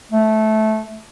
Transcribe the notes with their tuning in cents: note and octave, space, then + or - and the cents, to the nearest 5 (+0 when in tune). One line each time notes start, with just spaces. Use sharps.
A3 -15